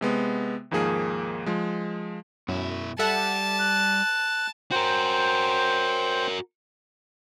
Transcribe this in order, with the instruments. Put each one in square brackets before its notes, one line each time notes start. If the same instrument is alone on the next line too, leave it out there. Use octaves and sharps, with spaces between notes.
[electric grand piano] C3 G#3 B3
D#2 G#2 F3 A#3 G#4
F3 G#3
[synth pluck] F#2 [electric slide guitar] B2 E4
[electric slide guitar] G3 [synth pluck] A4 E5 F#5 [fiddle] A5
[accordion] F#6
[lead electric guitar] F#4 A#4 [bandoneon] C5 G5